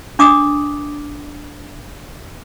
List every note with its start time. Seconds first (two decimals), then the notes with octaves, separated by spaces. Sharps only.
0.19 D4 D6 D#6